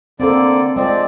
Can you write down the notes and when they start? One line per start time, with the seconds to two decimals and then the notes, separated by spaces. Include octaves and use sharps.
0.20 D3 A#3 C4 A4 D5
0.76 F3 G#3 C4 D5